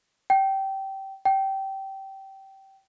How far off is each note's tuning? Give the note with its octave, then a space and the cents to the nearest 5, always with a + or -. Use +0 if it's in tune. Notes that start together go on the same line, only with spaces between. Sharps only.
G5 -20
G5 -20